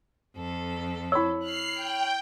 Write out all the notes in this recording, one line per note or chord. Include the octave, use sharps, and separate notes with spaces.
F2 A4
E4 C#5 B5 E6
F6 F#6 C7
G5